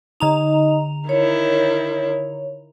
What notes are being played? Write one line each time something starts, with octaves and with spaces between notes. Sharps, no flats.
D3 D#4 D#5 A#5 F7
D#3 E4 C#5